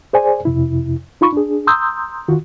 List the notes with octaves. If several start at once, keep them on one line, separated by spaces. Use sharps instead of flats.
G#4 C5 D5 G#5
F2 C3 E4
D#4 F4 B5 C#6
D4 G#4
A#5 C6 D#6 E6 G6
D#3 F4 F#4